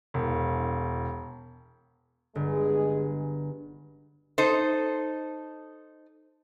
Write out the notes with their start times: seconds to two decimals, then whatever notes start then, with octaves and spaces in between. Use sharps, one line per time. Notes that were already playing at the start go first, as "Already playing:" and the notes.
0.14 E1
2.35 G1 G#3 G#4
4.38 D#4 A4 C5